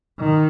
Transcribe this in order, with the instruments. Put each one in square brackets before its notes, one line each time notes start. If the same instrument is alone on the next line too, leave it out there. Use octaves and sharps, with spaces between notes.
[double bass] D#3